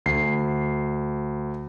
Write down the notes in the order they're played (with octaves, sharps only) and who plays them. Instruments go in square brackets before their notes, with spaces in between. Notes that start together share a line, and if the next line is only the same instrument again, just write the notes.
[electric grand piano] D2 C7